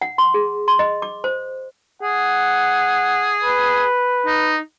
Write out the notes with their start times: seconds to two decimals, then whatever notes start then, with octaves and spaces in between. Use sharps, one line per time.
0.01 F#5
0.18 C6
0.34 G#4
0.68 C6
0.79 D#5
1.02 D6
1.24 C5
2.02 G#4 F#5
3.44 B4
4.26 D#4